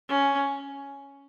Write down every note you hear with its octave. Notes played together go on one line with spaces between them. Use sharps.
C#4